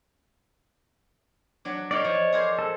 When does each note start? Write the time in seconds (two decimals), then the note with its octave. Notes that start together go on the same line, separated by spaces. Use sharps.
1.65 F#3 D4
1.91 D#4 A4 C#5 D5 F5
2.05 F3
2.32 G#4 A#4 C5
2.59 A4